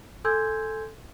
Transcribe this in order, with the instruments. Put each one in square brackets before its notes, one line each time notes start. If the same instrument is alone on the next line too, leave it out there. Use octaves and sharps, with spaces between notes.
[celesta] A4 G#5 C6 E6 G6 G#6